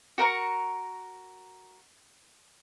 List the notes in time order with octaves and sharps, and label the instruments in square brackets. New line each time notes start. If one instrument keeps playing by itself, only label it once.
[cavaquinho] F#4 A#4 A#5 C#6